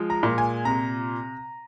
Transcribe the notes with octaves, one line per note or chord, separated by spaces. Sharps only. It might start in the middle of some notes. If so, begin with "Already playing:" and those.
Already playing: F3 G#3
A#5
A#2
G#5
C3 A#5